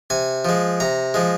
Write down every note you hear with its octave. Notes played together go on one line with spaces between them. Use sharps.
C3 G#5
F3 G#3
C3 A#5
F3 G#3